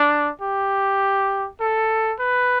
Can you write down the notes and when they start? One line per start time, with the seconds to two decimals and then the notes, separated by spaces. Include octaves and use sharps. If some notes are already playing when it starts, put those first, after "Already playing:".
Already playing: D4
0.42 G4
1.60 A4
2.19 B4